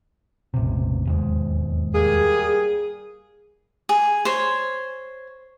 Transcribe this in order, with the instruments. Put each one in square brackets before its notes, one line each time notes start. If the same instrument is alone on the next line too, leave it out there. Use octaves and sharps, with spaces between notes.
[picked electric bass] E1 A1 C3
E1 D#2 G#2
[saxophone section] G3 A#3 G#4
[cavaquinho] G#4
C5 C#5